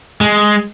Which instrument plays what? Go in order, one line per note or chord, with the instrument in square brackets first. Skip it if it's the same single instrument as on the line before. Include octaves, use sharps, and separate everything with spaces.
[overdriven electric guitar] G#3